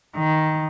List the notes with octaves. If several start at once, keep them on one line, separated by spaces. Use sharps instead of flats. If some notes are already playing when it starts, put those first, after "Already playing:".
D#3